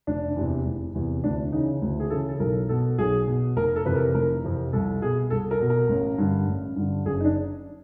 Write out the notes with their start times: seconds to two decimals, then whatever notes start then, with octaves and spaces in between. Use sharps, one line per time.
0.07 F1 D4
0.36 E2 C3 E3
0.65 F1
0.95 E2 C3 E3
1.24 D2 D4
1.52 C#3 E3 D#4
1.82 D2
2.00 G#4
2.10 C#3 E3 A4
2.29 A4
2.40 B1 A#4
2.69 B2 A4
2.98 B1 G#4
3.27 B2
3.56 F1 A#4
3.76 A4
3.85 F2 C3 E3 B4
3.95 A#4
4.14 F1 A#4
4.44 F2 C3 E3
4.73 C2 A4
5.02 B2 G#4
5.30 C2 A4
5.51 A#4
5.60 B2
5.70 A#4
5.89 A1
6.18 G2 D3
6.47 A1
6.76 G2 D3
7.05 F#1 G#4
7.20 D#4
7.25 D4